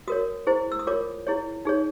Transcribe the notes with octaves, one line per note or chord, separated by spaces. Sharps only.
F#4 A#4 C#5 D#6
E4 G#4 C5
E6
D#6
F4 A#4 C#5 D6
E4 G#4 C#5
D#4 G#4 C#5